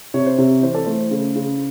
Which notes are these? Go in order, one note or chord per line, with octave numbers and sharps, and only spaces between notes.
C3 C#5
C5
C3 C#5
E3 C5
A4
A3 C5
C#3
C#3